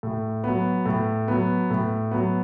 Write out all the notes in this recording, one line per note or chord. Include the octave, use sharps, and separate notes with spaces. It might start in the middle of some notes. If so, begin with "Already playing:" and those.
A2
F#3 B3
A2
F#3 B3
A2
F#3 B3